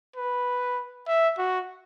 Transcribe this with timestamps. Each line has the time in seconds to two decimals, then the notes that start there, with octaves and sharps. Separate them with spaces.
0.16 B4
1.07 E5
1.38 F#4